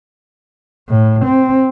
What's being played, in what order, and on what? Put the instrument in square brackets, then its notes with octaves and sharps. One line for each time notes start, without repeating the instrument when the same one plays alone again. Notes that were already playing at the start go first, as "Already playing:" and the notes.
[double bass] A2
C4